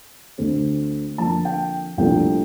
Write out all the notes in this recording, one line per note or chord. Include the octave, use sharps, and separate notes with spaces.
D2 D3 A3 C4
F2 D3 F3 A#3 A5
G5
C2 A#2 F3 A3 D4 G5